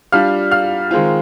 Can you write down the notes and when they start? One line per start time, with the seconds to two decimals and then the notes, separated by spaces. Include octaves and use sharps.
0.12 G3 D4 F4 F5 F6
0.51 F5 F6
0.91 D#3 G#3 C4 F4